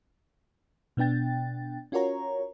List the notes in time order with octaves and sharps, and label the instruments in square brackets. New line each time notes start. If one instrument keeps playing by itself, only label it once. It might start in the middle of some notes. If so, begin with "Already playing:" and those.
[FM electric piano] B2 B3 D4 G5 A6
C#4 F4 F#4 A#4 C#5 A#5